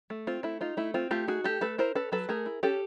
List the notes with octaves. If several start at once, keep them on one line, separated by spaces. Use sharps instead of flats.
A3
C4 F4
A3 E4
D#4 F4
A3 E4
C4 F4
A3 F4 G4
D#4 F#4 G#4
A3 G4 A4
A3 A4 B4
E4 A#4 C5
C#4 A4 B4
F#3 A4 B4
A3 G#4 A#4
E4
C#4 G4 A4